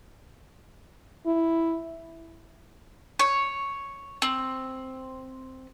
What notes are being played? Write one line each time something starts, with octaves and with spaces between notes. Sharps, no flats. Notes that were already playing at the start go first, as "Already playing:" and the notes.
E4
C#5
C4